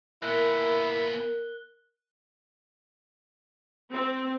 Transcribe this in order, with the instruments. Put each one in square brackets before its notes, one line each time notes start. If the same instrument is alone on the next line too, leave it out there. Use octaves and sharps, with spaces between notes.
[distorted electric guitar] A#2 B3 [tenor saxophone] E4 [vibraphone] A#4 [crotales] F#6 G7
[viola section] C4